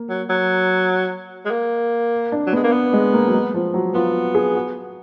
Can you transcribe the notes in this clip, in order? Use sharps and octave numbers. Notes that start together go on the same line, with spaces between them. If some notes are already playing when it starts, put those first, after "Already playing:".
Already playing: A#3
F#3
F#3
G#3
A#3
D4
F#3
B3
G#3
A#3
B3
G#3
A#3
F#3
G#3
F3
F#3
B3 F4
G#4
F#4